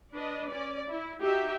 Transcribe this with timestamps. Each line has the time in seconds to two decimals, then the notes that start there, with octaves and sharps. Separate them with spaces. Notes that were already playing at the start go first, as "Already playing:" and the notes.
0.15 D4 B4 D#5
0.49 C#4 D5
0.88 E4
1.22 D#4 F#4 G4 E5